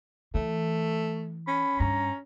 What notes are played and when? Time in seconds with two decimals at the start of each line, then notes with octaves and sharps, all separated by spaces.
0.34 E3 A3
1.48 C#4 B5
1.80 G2 A#5